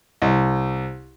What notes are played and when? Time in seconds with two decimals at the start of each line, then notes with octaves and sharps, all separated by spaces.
0.22 C2